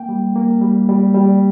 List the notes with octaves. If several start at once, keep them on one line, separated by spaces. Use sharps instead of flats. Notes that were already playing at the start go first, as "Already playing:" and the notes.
Already playing: A#3 G5
G3
A#3
G3
G3
G3